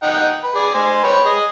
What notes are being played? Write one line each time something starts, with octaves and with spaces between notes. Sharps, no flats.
D#4 F#5 G5
B4
G#4 D5
C5 G#5
B4 C#5 G5
G#4 D#5